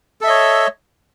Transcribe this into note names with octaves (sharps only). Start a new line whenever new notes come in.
A4 C#5 D#5 E5